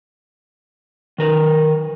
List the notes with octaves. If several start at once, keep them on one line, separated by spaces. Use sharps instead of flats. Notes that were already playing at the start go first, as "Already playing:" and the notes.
D#3 A#4 B4